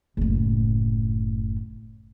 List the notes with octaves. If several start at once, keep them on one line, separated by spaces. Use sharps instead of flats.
F#1 A2